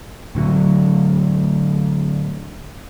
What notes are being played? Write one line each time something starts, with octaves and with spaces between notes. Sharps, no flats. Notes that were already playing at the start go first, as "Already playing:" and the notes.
A2 D3 F#3